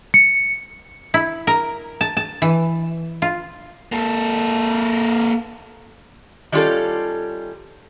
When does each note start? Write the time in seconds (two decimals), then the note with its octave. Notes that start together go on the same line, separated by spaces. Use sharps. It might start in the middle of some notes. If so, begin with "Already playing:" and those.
0.14 C#7
1.14 E4
1.47 A#4
2.01 A5
2.17 A5
2.42 E3
3.22 F4
3.92 A#3 A4
6.52 D#3 G3 C#4 F4 G4 A4